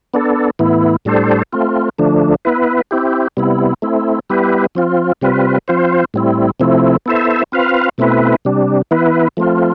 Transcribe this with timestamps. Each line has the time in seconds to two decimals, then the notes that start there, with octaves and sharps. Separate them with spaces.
0.14 B3 D4 A4
0.59 A2 E3 B3 E4
1.05 A2 G3 D4 A4 C5
1.52 A3 C4 F4
1.99 D3 F3 A3 D4
2.45 B3 E4 B4
2.91 C4 E4 G4
3.37 C3 G3 B3 E4
3.82 A3 C4 E4
4.30 G3 B3 E4 G4 B4
4.75 F3 C4 F4
5.21 C3 G3 C4 F4 B4
5.68 F3 C4 F4 C5
6.14 A2 G3 C4 E4
6.60 C3 F3 A3 C4 E4
7.06 B3 E4 A4 C5 E5
7.52 C4 F4 B4 F5
7.98 B2 A3 C4 E4 B4
8.45 C3 G3 D4
8.91 E3 B3 E4 B4
9.37 F3 A3 C4 F4